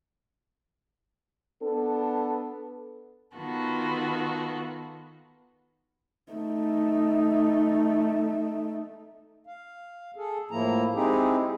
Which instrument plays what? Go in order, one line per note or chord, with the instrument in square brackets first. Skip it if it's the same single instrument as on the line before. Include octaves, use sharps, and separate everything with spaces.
[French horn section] B3 D4 A4
[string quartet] D#3 B3 F4 F#4 A4
[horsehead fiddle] A3 D#4
[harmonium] F5
G#4 A4
A2 F3 A#3 E4 A#5
G#3 C4 D#4 E4 G4 G#4